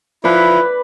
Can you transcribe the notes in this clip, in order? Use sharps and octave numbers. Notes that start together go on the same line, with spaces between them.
F3 E4 B4 D5